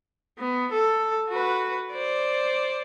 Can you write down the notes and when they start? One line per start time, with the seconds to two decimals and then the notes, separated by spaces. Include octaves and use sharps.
0.39 B3
0.72 A4
1.29 F#4 B4
1.92 C5 D5